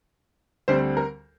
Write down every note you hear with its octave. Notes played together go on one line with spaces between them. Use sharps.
D2 D3 G3 C4 C5
A#4